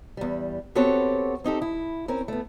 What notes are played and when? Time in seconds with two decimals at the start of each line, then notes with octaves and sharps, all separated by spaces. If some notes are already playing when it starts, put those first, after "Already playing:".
0.17 E2 G3
0.75 B3 C4 F#4 G4 A4 C#5
1.44 C4 D#4 G4 A4
1.62 E4
2.08 C4 C#4 A#4
2.28 A3 B3